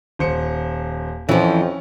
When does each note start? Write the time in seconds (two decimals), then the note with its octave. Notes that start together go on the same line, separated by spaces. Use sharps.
0.19 D#1 C5 C#7
1.29 F2 E3 F3 C#4